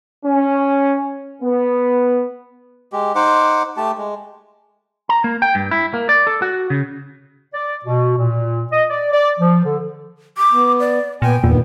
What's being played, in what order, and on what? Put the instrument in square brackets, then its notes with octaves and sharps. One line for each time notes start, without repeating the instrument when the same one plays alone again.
[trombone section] C#4
B3
[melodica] G#3 G4
D#4 C5 F#5 D6
A3 G4 A5
G#3
[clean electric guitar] A#5
A#3
G5
G2
E4
A#3
D5
A4
F#4
C#3
[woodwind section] D5
B2
A#2
D#5
D5
D5
F3
D3
[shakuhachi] D6
[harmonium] B3
[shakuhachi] D5
[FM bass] A#2 [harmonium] B3 G#5 [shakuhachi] G5
[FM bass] E2 [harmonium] G2 D#3 B3 [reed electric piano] A#2